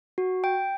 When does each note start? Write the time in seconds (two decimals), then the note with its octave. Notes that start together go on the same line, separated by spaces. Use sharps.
0.18 F#4
0.44 G5